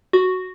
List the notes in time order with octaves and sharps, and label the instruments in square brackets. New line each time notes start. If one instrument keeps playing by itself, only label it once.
[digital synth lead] F#4